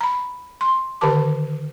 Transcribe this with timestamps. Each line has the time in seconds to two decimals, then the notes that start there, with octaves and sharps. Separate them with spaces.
0.01 A#5 B5
0.61 C6
1.01 D3 D#3 G4 A#4 A5 D6